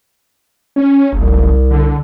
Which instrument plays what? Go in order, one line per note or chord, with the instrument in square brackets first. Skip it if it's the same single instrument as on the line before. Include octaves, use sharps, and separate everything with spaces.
[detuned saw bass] C#4
[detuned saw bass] F#1 [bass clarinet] C2
[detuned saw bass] D3